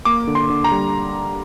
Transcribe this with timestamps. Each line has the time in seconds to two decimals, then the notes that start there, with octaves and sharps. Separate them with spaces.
0.05 A#3 D6
0.27 D3
0.35 C6
0.49 D3
0.64 A#5
0.72 G3